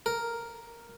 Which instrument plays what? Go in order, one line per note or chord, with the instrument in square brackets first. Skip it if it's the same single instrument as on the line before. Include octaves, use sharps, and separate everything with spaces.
[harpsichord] A#4